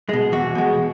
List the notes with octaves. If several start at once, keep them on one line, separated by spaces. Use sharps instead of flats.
B2 G#3
E2 F#4
B2 G#3